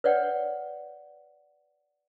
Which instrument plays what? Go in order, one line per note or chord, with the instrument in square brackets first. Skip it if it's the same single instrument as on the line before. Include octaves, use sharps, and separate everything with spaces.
[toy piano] B4 C#5 D5 F#5 G5